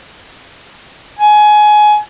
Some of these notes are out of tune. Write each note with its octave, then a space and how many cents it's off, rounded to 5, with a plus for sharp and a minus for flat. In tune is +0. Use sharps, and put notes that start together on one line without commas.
G#5 +20